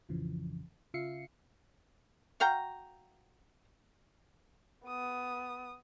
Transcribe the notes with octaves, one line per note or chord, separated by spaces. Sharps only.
A1 F2 C#3 E3 F3
C#3 F4 E5 F5 C7 C#7
F#4 F5 G5 A#5
B3 D#6